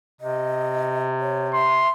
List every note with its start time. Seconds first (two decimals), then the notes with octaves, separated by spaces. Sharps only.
0.21 C3 D#5
1.20 C#5
1.54 E5 C6